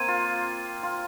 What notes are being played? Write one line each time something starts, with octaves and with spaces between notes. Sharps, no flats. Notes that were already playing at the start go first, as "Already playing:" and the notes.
Already playing: A#3 C4 A#5 G#6 D#7
F4
F4